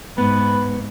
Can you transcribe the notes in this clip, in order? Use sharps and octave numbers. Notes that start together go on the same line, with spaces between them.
G#2 B3 B4